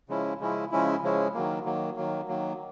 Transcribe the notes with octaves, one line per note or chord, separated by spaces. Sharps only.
C#3 F3 G#3 C#4 E4
C#3 F3 G#3 C#4 E4
C#3 F3 G#3 C#4 E4
C#3 F3 G#3 C#4 E4
D#3 F#3 A#3
D#3 F#3 A#3
D#3 F#3 A#3
D#3 F#3 A#3